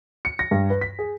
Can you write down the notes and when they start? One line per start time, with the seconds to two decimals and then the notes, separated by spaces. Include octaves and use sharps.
0.25 C#7
0.39 A#6
0.51 G2
0.70 B4
0.81 B6
0.99 G#4